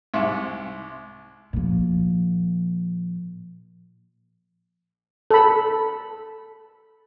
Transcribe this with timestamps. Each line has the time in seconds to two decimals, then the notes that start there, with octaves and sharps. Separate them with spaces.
0.14 C2 G#2 E5
1.53 A#2 F3
5.31 A4 B5